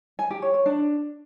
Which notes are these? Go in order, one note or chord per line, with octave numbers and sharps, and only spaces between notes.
G#5
G4
C#5
C#5
D4